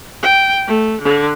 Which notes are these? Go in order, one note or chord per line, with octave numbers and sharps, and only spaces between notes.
G5
A3
D3